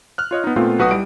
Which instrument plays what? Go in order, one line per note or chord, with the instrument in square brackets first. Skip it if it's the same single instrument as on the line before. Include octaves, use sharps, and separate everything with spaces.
[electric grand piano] F6 F#6
F4 C#5 D#5
B3 D#4
A#2 A3 B3 C4 F4
B1 F#4 B4 F#5 D#6
G3 E4 D7